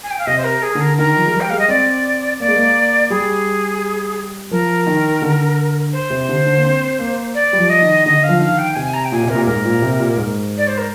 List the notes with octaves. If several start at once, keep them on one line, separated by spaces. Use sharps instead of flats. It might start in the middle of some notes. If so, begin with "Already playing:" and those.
G#5
G5
F5
C3 D#5
C5
A#4
G#4
D3
A#4
D#3 A#4
F3
G#3
G3
G5
G#3 F5
D#5
C4 D5
A#3 D5
G#3
A#3
G3 G#4
F3 A#4
D#3
D3
C5
C3
D3
D3
A#3
C4
A#3
D5
G3
F3
D#5
D#3
D3 D#5
F5
F3
D#3 F5
G5
C3 G#5
A#5
G5
A#2 G#5
C3
A#4
A#2
G#2 A#4
A#2
C3
A#2
G#2
D5
C5
A#4